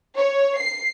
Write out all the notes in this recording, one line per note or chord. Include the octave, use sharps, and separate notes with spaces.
C#5
C7